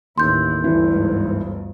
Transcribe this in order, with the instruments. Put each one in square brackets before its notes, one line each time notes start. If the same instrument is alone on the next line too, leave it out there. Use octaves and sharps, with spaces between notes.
[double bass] A1 E4 [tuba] D#2 [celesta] C6 G6
[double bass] G1 D2 [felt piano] E3
[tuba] G#2